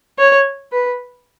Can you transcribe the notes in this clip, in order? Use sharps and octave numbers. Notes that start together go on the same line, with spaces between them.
C#5
B4